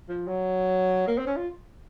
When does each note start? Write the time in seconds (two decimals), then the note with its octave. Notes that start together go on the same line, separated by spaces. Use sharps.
0.09 F3
0.28 F#3
1.08 A#3
1.18 C4
1.27 C#4
1.37 F4